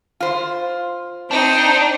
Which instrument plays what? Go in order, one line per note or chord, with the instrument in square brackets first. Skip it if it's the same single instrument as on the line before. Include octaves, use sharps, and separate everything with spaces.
[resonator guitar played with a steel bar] F4 C5
[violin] C4 D#4 [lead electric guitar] D4